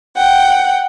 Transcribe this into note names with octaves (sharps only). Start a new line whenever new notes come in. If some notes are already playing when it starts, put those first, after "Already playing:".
F#5 G5